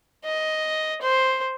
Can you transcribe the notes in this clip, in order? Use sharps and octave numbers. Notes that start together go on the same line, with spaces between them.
D#5
C5